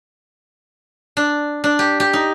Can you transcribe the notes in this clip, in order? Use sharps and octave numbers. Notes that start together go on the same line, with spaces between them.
D4
D4
G4
G4
D#4